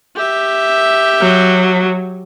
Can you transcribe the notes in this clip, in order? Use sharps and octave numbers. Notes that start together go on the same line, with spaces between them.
G4 E5
F#3